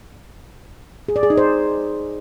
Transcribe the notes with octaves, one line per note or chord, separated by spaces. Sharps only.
G#4
D5
G#4
D#4
C5